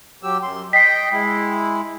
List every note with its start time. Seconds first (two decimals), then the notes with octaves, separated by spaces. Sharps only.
0.23 F#3 G4 E6
0.43 F#2 C6
0.73 D#5 G5 B6 C7
1.12 G#3 E4